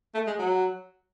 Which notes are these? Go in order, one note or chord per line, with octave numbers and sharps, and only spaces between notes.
A3
G#3
F#3